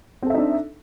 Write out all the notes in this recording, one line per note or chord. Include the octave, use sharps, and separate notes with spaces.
C4 D4 D#4 A4 E5